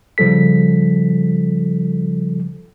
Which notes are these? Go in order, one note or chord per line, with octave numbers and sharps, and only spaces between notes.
C#3 F3 G3 A4 B6